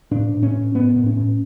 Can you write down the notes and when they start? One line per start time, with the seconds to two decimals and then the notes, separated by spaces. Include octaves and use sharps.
0.11 A2 D4
0.33 A2
0.43 C#4
0.53 A2
0.74 A2 B3
0.96 A2
1.06 C#4
1.17 A2